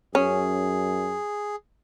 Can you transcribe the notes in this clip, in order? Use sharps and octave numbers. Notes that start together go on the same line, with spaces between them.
F#2 C#4 G#4